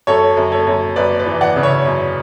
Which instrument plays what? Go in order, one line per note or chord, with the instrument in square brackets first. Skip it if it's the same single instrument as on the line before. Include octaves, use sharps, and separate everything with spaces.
[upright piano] F#2 A4 C#5
F#2
A4 C#5
F#2
F#2 B4 D5
B4 D5
E3
D5 F#5
C#3
C#5 E5
F#2